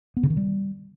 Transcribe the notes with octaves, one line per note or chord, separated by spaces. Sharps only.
B3
C#3
D#3
G3